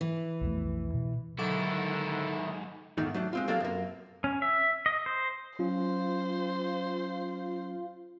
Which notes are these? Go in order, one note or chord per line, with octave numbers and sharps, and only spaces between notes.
E3
B1 F2 A3
B2
D#2 G#2 D3 D#3 F#3 E4 A4 D6
E2 G#2 D#3 A3 D#4
F#3 A3 D4
G#3 C4 F4
F#3 A#3 C4 A4 D5 F5
F#2 A#3
C#4
E5
D#5
C5
F#3 C#4 F4 C5